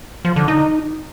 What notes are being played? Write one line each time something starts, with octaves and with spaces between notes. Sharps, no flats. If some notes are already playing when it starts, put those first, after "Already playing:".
F3
D3
D#4